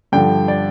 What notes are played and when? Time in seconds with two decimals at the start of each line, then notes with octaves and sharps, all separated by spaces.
0.12 G2 D3 F3 G5
0.48 D5